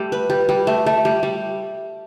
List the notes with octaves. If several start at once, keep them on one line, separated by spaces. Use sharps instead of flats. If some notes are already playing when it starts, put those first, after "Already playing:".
Already playing: G3 A3
B4
G3
G3
A3
A3
G3
G3